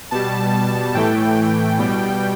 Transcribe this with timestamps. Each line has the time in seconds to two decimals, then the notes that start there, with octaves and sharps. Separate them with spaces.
0.11 B2 G3 A5
0.94 A2 E3 A3 G5
1.79 B2 G3